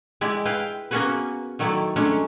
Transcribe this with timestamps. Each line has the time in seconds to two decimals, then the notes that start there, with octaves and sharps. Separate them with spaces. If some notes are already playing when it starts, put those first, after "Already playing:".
0.21 G#3 E4 G4 D5
0.45 E4 B4 F5 G5
0.91 A#3 B3 C#4 F#4 G#4 B4
1.59 D#3 F#3 A3 E4 D5
1.96 F#3 G#3 A3 C#4 D4